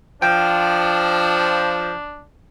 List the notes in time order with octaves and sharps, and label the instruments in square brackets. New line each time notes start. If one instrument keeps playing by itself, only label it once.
[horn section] F3 [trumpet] D4 [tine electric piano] G5